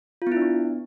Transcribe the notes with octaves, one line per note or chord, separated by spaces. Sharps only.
F4
B3
E4
D4
B3